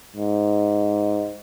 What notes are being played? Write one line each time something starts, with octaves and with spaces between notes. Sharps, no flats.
G#2